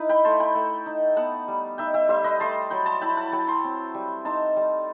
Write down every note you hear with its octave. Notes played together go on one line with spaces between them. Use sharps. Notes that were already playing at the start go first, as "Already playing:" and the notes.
Already playing: D#4 E4 B4
G5 B5
A3 A5 C6
G5 B5
A3
D#4
B3 F#5 A5
G3
D#4 E5 G5
E5 G5
G3 C5 E5
B4 D#5
A3 A5 C6
F#3 G5 B5
A5 C6
E4 G5 B5
F#5 A5
F#3 G5 B5
A5 C6
C4
G3
D#4 A5 C6
G3